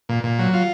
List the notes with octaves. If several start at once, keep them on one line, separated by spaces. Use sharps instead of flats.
A#2
A#2
F#3
F4